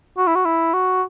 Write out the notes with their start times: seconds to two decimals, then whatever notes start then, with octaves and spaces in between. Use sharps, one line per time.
0.17 F#4
0.27 E4
0.35 F#4
0.45 E4
0.73 F#4